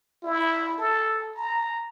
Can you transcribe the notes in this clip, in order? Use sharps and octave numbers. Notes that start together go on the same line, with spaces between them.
E4
A4
A#5